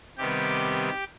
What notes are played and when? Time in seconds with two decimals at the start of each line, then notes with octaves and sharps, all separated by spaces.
0.18 C3 D#3 G3 B3 G4 G5